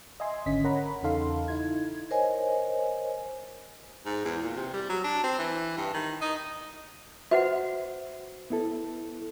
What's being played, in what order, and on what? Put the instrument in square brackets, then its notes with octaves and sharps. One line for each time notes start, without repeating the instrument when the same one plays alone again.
[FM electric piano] D#5 E5 G#5 C6
G#1 D3 C#4 D#5 B6
A#4 C#5 F#5 A#5 B5
E2 C#3 D#4 A4 F5 C6
D#4 E4 G#6
[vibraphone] A#4 C5 C#5 D#5 G#5
[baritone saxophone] G#2
E2
A#2
C3
G3
F#3
D4
C4
E3
G2
D#3
D#4
[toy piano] F#4 B4 F#5 [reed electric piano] C5 [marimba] E5
[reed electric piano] B3 E4 A4